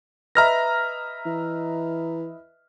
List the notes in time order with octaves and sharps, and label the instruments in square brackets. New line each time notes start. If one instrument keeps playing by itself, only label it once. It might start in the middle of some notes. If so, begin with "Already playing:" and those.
[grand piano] B4 D#5 E5 [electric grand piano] A#5 F6 A#6
[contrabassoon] E3